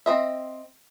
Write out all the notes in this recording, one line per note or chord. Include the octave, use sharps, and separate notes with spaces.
C4 D#5 E5